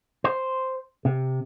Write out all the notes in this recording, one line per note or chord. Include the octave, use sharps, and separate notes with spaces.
C5
C3